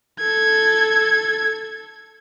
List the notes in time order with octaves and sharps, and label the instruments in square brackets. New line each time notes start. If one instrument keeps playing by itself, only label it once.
[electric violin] A4 G#6